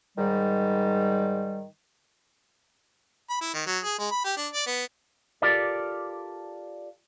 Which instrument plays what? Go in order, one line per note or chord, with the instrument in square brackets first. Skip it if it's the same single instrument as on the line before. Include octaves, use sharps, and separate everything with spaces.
[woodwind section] G#2 D#3 G3
[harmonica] B5
E4
D#3
F#3
G#4
G#3
B5
G4
D4
D5
B3
[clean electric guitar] F4 G4 A4 A#4 D5